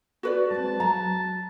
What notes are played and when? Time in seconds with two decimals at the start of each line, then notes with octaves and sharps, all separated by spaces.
0.23 F#4 B4 D5
0.51 G#3 C4 A5
0.80 F#3 A#5